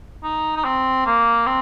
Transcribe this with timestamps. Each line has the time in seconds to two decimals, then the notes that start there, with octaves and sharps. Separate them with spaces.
0.24 D#4
0.57 D#4
0.65 C4
1.06 A#3
1.46 C4